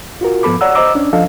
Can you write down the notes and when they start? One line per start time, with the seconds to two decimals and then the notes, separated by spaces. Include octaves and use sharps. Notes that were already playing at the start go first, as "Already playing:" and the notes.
0.21 F4 F#4 A#4
0.43 G#2 F3 B3 A4 B5 D6
0.61 C#5 D5 F#5 A#5 E6
0.75 C5 D#5 A#5 D6 E6
0.95 C#4 D4
1.13 F3 D4 A4 D#5 F5